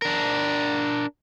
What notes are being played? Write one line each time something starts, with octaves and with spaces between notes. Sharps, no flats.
D4 A#4